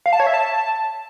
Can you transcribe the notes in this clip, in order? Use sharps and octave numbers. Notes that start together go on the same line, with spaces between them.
F5
A5
C#5
E5
A5